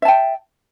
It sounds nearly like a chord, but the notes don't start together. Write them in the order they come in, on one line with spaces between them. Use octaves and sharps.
E5 A5 G5